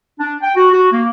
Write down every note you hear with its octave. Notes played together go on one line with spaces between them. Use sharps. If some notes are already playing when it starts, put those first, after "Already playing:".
D4
G5
F#4
F#4
A#3